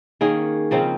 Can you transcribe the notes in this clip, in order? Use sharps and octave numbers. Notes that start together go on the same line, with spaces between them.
D#3 A#3 C#4 G#4
C#3 F3 C4 D#4